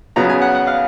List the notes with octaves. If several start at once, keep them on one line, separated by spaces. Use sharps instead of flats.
C#3 F#3 B3 A#5
G#5
F#5
F#5
F5